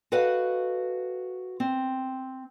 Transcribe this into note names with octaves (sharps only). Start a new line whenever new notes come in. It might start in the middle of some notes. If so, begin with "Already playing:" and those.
F#4 A4 B4 D#5 F5 F#5
C4